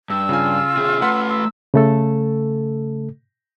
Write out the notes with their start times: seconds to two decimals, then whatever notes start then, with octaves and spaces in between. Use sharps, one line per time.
0.10 G2 E6
0.29 C#3 F4 G#5
0.77 C3 G#4
1.02 A3 B4 F#5 C6 B6
1.30 C6 E6
1.74 C#3 A3 A4